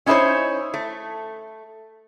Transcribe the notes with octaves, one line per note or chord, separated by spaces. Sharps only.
C#4 D#4 E4 G4 C5 C#5
A3